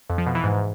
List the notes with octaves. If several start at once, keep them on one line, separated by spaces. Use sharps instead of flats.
F2
F3
B2
E3
G#2